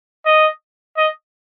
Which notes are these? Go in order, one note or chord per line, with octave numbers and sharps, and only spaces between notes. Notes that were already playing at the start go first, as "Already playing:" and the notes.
D#5
D#5